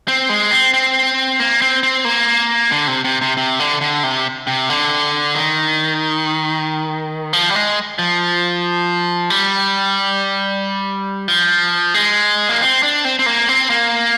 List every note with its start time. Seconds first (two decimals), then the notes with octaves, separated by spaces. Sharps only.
0.08 C4
0.29 G#3
0.51 C4
0.74 C4
1.40 A#3
1.62 C4
1.83 C4
2.05 A#3
2.71 D3
2.87 C3
3.04 C3
3.21 C3
3.37 C3
3.60 D3
3.81 D3
4.03 C3
4.47 C3
4.69 D3
5.35 D#3
7.33 F3
7.50 G3
7.55 G#3
7.99 F3
9.30 G3
11.28 F3
11.94 G#3
12.49 A#3
12.61 C4
12.83 D4
13.05 C4
13.19 C4
13.26 A#3
13.49 C4
13.70 A#3